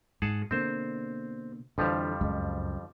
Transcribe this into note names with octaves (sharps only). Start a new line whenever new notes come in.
G#2 G#4 F#5 A5
B2 D3 A#3 C4 C5
F2 D3 E3 F3 G3
C#2 F#2 G#3